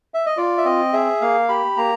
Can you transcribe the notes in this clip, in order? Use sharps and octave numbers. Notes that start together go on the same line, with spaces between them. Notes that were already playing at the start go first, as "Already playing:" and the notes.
E5
D#5
F4 D5
E5
C4 D#5
G#4 E5
A#3 F5
G4 B5
A#3 A#5